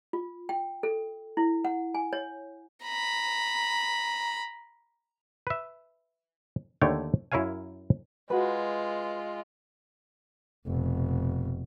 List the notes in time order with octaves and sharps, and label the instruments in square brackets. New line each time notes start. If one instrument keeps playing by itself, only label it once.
[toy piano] F4
G5
A4
E4
F#5
G#5
C#5
[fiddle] A#5 B5
[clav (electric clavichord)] B4 E5
D#2 D3 A3 C#5 G5
F#2 E4 A#4 C#5 F5 G#5
[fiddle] G#3 F4 [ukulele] F#4 B4
[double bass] F1 B2